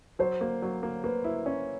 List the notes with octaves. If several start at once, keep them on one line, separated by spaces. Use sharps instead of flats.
F#3 C5
A#3
F#3
A#3
A#3 B4
E4
C#4